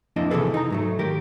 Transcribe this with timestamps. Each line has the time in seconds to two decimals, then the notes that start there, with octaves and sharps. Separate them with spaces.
0.16 F2 A#3 D4 E4 D#5
0.30 C3 E3 A#3 G#4 A4 B4
0.54 D#4 A#5
0.71 G#2 F#3 A3
0.99 D#3 G4 A#4